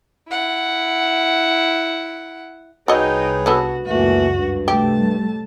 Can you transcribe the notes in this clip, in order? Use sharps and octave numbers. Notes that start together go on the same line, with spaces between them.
E4 F#5
C2 D#4 F#4 G#4 B4 C#5 D#5 G5
D3 B3 F#4 A4
C#2 F#2 A#2 E3 A3 F#4
G2
C3 G3 A3 G4 A5